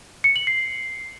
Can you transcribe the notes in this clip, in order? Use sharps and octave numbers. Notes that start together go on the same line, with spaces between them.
C#7
F#7
C7